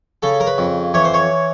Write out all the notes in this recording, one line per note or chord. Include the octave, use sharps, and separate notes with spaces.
C#3 A4
A#4
B4
F2
E3 C#5
C5
C#5